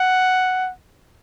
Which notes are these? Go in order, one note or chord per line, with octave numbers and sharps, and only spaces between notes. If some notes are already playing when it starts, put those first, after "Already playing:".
Already playing: F#5